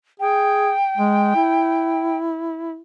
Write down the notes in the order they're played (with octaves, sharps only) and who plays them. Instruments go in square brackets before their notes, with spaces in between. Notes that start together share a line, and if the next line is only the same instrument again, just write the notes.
[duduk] G#4 [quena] G5
[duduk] G#3
E4